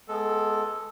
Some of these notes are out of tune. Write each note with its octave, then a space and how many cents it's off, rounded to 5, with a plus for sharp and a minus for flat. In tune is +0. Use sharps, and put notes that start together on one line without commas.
G#3 +25 B3 +0 A4 +0